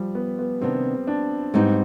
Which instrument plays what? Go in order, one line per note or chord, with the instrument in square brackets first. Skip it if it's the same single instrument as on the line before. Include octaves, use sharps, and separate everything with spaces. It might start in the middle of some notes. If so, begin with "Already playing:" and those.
Already playing: [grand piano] F3 G3
B3
B3
[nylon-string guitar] C3 D#3 B3 D4 [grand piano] C4
[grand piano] D4
[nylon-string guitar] G#2 G3 B3 D#4 [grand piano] C4